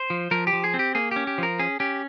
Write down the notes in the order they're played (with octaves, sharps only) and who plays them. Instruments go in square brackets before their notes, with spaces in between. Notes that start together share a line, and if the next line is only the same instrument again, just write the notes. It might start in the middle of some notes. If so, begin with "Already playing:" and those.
Already playing: [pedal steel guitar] C5
F3
F3 A#4
G4
F3
G#4
C4
G4
A#3 G#4
C#4 G4
G4
F3 A#4
C#4 G#4
C#4 G4